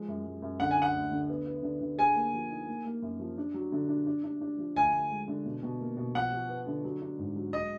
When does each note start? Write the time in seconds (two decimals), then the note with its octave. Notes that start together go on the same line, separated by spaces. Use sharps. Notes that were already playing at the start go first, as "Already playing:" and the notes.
Already playing: F3 G#3
0.08 F#2
0.25 G#3
0.42 F#2
0.60 D3 F#5
0.71 G#5
0.76 D4
0.82 F#5
0.95 D2
1.11 D3
1.30 B3
1.47 B3
1.63 D3
1.81 D3
1.98 G#4 G#5
2.15 A#3
2.33 F3
2.51 D#4
2.67 A#3
2.85 A#3
3.02 F#2
3.20 F3
3.38 D4
3.54 F#3
3.72 D3
3.89 D4
4.07 D4
4.24 D4
4.41 D4
4.58 F3
4.76 D2 G#5
4.93 D2
5.10 G#3
5.28 D3
5.45 B2
5.63 B2
5.80 A#3
5.97 B2
6.15 F3 F#5
6.32 F3
6.49 B3
6.67 D3
6.84 F#3
7.02 D4
7.19 G#2
7.36 F#3
7.53 G#3 D#5